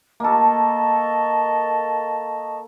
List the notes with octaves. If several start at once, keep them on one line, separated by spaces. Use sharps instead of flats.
A#3 A4 D#5 A5 C#6